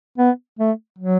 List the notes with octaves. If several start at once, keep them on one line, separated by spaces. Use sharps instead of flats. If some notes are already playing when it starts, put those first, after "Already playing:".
B3
A3
F#3